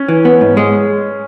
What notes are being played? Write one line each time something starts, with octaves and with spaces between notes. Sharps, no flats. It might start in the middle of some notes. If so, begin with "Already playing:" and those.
Already playing: C#4
E3
B3
G#2
G#3